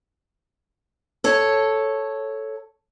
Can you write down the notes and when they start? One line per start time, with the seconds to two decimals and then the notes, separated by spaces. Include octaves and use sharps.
1.24 A4 C#5